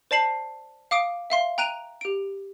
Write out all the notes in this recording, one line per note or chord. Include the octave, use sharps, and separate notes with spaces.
C5 D5 A5 C7 F#7
F5 D6 D#6 D7
E5 F5 C6
G5 A#5 F#6 D7 D#7 F7
G4 D7